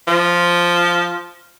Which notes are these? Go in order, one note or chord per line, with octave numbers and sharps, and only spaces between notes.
F3